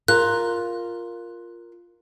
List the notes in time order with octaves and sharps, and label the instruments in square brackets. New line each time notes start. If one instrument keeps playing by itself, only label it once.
[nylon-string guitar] F4 A#4 [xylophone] F#6